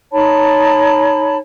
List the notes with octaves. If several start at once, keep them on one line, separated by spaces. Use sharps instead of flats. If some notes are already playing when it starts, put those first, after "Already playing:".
D#4 C#5 A5 B5